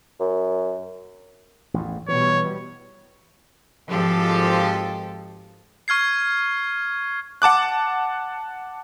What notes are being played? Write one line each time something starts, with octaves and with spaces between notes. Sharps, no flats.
F#2
A1 E2 A2
B2 E3 G3 B3 C#5
G#1 F3 G#3 G4 A4
C#6 F6 G#6 C7
F#5 A5 D6 F#6